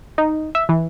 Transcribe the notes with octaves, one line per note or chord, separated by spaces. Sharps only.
D#4
E5
E3